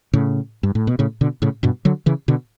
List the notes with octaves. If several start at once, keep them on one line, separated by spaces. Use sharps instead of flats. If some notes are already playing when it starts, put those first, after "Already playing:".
A2 C#3
G2
A2
B2
A2 C#3
B2 D3
A2 C#3
G2 B2
D3 F#3
C#3 E3
B2 D3